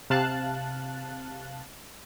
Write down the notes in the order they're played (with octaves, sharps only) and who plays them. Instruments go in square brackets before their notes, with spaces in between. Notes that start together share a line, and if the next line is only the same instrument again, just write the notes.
[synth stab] C3 F5 A5 F#6